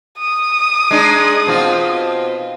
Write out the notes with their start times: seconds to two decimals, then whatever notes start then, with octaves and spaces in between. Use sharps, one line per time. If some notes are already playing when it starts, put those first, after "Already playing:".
0.19 D#6
0.91 G#3 D4 D#4
1.47 B2 C4 F4